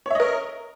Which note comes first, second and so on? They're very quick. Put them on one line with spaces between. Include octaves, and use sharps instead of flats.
C#5 E5 D#5 A#4